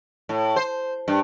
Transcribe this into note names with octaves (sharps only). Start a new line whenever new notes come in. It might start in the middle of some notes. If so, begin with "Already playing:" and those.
A2
C5
G2